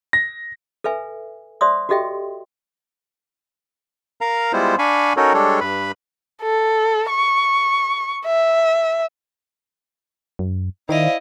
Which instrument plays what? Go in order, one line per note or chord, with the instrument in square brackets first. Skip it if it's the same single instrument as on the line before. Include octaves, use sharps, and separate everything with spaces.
[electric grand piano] A#6
[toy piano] A4 B4 E5 G#5
C5 D5 E5 C6 D#6
F#4 G4 A4 D#5 E5 G5
[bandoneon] A#4 F5 A#5
G3 G#3 B3 E4 F4 C5
D4 F5 G#5 B5 C#6
C#4 D#4 F#4 A4 A#4 C#5
G3 G#3 D4 A4 C#5
G2 B4 B5
[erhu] A4
C#6
E5
[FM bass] F#2
[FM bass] D#3 [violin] E4 D#5 [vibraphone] C5 D5 F5